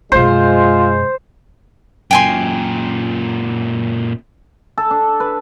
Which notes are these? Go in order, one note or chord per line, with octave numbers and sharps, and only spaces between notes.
F#2 B2 G#3 F4 C5
F#2 A#2 G5 G#5 C6
A4
D4
B4